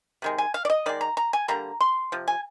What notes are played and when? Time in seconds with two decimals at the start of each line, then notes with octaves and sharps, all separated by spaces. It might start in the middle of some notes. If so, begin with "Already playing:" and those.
0.22 C3 D#3 G#3
0.38 G#5
0.54 F5
0.65 D5
0.70 D#5
0.86 D#3 G#3 D5
1.01 A#5
1.17 A#5
1.33 G#5
1.48 D3 G3 A#3 A#5
1.81 C6
2.12 C3 F3
2.28 G#5